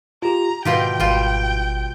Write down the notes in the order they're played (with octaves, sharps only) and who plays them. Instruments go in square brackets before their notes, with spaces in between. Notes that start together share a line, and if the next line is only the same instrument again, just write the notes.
[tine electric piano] F4 G4 [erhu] A#5
[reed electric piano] G#2 E4 [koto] B2 F4 G4 [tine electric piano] D#3 [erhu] G5
[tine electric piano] G#1 [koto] G3 F4